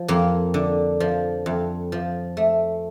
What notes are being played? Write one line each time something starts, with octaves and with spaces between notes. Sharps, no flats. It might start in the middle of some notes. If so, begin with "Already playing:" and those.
Already playing: F3
F2 A#3
D3
F3
F2
F3
A3